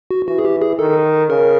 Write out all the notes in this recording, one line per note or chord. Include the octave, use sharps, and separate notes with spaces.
F#4
E3 F#4
G#4
G4
G#4
D#3 A4
C#3 A#4